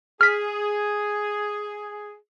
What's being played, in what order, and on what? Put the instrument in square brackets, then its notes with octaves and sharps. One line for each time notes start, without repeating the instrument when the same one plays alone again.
[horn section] G#4 [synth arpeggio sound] F6 B6